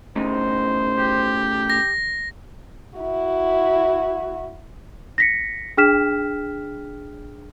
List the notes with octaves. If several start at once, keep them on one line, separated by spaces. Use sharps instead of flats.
A2 C#3 D#4 C5
G4
A#6
E4 F#4
A#6 B6 C#7
D4 G#4 G5 F6 B6 E7